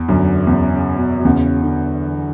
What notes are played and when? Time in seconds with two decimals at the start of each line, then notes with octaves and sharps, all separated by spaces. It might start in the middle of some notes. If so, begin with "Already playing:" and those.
Already playing: E2
0.09 F#2 D3
0.47 E2 C#3
0.73 C#3
0.99 B2
1.20 B2
1.24 E2 C#3
1.63 D3